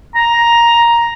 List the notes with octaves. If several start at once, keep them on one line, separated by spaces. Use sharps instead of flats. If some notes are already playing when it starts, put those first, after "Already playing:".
A#5